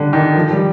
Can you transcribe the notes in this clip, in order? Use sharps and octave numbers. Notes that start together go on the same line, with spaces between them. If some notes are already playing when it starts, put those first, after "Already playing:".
Already playing: D3 G3
D#3
F3
G3